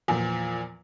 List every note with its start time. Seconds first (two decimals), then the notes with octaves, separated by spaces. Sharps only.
0.08 E2 A#2 F3